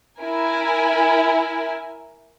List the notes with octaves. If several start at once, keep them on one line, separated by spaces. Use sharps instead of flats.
E4 A#4 G#5